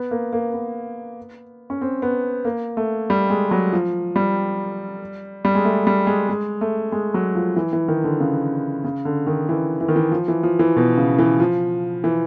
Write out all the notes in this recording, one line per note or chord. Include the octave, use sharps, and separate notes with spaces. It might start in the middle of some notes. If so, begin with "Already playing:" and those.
Already playing: B3
A#3
A#3
B3
C#4
C4
B3
A#3
A3
G3
G#3
F#3
F3
G3
G3
G#3
A3
G3
G#3
G#3
A3
G#3
F#3
F3
E3
E3
D#3
D3
C#3
C#3
D3
D#3
E3
E3
D#3
E3
F3
E3
F3
E3
B2
C#3
E3
F3
E3